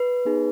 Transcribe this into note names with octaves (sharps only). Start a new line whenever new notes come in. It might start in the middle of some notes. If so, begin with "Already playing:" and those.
Already playing: B4
B3 D#4 G#4